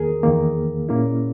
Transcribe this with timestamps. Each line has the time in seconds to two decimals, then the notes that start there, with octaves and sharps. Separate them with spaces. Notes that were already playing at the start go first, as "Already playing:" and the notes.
Already playing: E2 D#3 A#3 G#4 A#4
0.23 E2 D#3 A#3
0.89 A#2 A#3 C#4 E4